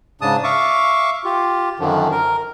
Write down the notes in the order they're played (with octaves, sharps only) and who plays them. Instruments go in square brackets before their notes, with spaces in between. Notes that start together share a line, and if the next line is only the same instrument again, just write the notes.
[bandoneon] G#2 C#3 D4 A5 D#6
E5 F5 C#6 D6
F4 G4
F#2 D3 D#3 F3
A#4